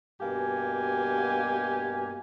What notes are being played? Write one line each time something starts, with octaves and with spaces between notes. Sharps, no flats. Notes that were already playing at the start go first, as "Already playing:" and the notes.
G2 B2 A#3 G4 G#5